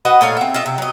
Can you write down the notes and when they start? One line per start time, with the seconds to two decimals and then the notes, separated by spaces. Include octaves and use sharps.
0.05 F#4 B4 D#5 F#5
0.21 A#2 A3 C#5 F5
0.37 C4 E5
0.54 F4 D#5 E5
0.66 C3
0.78 F#3 D#5